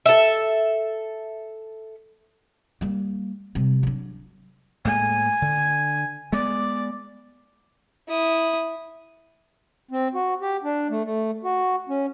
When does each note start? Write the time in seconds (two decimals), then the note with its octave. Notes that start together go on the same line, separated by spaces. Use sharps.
0.06 A4 E5
2.81 G3 A#3
3.55 C3 G3
3.83 F#3 D4
4.85 A2 G#3 A#3 G#5
5.42 D3
6.33 G#3 B3 D5
8.08 E4 D#6
9.91 C4
10.14 F#4
10.42 G4
10.63 D4
10.90 A3
11.04 A3
11.44 F#4
11.89 C#4